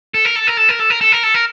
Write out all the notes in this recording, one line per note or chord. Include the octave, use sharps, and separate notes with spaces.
A4
A#4
A4
A#4
A4
A#4
A4
A#4
A4
A#4
A4
A#4